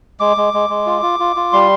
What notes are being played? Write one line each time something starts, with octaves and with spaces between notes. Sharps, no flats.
G#3 D6
G#3
G#3
G#3
F4
F4
F4
F4
G3 C6